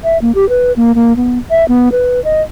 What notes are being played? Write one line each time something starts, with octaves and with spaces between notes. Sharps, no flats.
E5
A#3
G4
B4
A#3
A#3
B3
E5
B3
B4
D#5